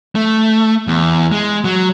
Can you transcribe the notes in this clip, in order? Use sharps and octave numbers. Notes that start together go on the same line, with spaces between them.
A3
E2
G#3
F#3